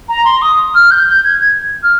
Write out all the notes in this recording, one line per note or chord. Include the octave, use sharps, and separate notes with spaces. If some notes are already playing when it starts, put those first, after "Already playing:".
A#5
C6
D#6
F6
G6
G6
G#6
G#6
F6